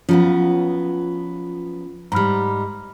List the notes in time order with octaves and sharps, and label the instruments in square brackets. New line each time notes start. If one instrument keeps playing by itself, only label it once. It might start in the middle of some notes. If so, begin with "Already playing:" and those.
[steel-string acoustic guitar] F3 F#3 B3 [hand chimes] C#4 F4
[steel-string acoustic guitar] G#2 G3 [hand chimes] A#5 B5 F6